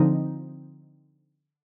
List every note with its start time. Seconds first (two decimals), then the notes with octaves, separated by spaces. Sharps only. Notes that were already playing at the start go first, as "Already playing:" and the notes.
Already playing: D3 F3 C4 D#4